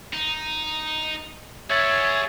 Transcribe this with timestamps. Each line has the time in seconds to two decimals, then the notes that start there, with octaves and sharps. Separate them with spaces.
0.13 D#4
1.70 G#4 C#5 E5 F#5 G#6 A6